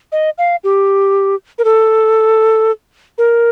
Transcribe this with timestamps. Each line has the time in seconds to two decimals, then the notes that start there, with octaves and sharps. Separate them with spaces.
0.12 D#5
0.38 F5
0.64 G4
1.58 A#4
1.64 A4
3.18 A#4